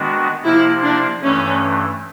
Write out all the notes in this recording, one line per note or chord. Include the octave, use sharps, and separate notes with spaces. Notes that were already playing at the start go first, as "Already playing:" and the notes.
Already playing: D#3 G#3 B3 D4 F#4
C3 F3 A#3 E4
D4
G2 E3 A3 C#4